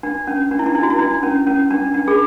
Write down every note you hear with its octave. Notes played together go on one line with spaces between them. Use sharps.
D4
C#4
D4
E4
D4
E4
F#4
E4
D4
C#4
C#4
D4
D4
G#4